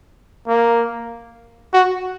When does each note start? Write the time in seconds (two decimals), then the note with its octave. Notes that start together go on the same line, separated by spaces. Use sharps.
0.48 A#3
1.73 F#4